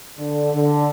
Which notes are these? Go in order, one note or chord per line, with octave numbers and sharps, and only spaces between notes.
D3
D3